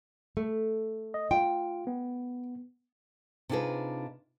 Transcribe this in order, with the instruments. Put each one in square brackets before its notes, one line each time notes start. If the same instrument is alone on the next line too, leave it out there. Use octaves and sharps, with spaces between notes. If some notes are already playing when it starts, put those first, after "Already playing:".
[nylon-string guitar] A3
[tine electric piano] D#5
[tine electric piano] F4 [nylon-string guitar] G5
[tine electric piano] B3
[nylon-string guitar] C3 D4 D#4 F4 G#4 B4